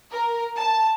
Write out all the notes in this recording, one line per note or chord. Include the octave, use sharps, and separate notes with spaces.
A#4
A5